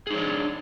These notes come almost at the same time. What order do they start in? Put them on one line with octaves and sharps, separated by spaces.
G#4 D#4 C#5 D4